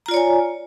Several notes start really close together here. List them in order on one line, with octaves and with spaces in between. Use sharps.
A#5 F4 D5 C#5 G#5